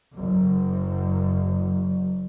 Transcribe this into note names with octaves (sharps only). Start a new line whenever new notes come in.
F#1 F#2